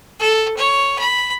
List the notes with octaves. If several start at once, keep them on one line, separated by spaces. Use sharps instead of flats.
A4
C#5
B5